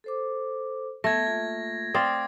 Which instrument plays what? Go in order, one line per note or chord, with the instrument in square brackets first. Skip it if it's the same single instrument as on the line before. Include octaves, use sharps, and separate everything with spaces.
[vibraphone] A4 C5 D6
[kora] A3 [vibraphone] B3 [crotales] G#6 A#6
[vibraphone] A#3 F4
[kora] C4 D5 F5 [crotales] D#6